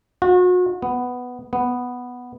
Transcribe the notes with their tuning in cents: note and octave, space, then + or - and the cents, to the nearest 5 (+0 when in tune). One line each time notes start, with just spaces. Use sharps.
F#4 -35
B3 +5
B3 +0